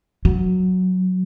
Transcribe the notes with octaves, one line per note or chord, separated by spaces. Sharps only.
F#3